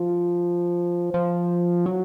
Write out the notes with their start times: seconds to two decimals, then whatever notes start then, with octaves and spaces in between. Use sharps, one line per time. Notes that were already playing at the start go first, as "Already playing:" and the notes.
Already playing: F3
1.14 F3
1.86 F#3